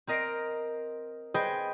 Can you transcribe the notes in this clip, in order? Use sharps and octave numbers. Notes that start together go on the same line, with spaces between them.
C4 A#4 D#5 A#6 C7 D7
G#4 B4 C5 D#5 G5 G#5